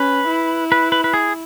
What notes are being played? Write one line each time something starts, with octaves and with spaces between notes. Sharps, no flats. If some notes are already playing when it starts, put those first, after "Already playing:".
Already playing: C#4 B4
E4
B4
B4
B4
G#4